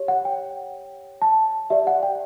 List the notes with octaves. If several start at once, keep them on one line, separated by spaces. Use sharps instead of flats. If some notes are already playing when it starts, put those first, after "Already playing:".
Already playing: G4 C#5
F#5
G5
A5
G4 D5 E5
F#5
G5